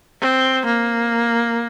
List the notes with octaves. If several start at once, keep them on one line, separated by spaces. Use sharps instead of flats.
C4
A#3